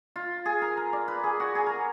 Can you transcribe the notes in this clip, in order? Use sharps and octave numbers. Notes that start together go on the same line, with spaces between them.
F4
G#4
A#4
A#4
D5
B4
G#4
F#4
G#4
A#4